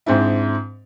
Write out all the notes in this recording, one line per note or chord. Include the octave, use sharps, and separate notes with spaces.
G#2 C4 D4 E4